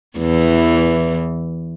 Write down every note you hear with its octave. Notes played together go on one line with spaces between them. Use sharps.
E2 E3